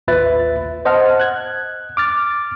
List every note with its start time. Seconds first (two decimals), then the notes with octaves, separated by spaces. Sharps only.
0.08 A1 D#2 F4 B4 E5 A6
0.85 C5 D#5 F#5 A5 F6
1.20 F#6 G#6
1.97 D6 F6 A6